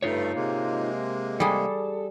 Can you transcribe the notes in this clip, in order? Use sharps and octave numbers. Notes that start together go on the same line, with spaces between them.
G2 A3 D#4 F4 C#5
C3 G#3 A#3
G3 G#4 A4